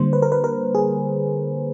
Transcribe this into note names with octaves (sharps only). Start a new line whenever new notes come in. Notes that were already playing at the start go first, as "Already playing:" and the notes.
Already playing: D3 G3 A#3 C5
B4
A#4
B4
A#4
G#4